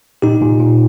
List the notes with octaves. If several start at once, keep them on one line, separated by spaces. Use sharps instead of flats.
A#2 D#4 G4
A#2
A#2